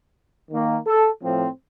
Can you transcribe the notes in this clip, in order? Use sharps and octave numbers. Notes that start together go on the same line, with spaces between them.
D#3 A#3
A4
A2 F3 C4